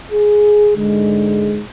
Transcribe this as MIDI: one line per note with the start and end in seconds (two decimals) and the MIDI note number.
0.12 0.71 68
0.75 1.60 44
0.75 1.60 50
0.75 1.60 56